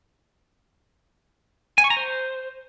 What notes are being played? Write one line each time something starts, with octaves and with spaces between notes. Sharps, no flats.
G#5
C#6
A#5
C5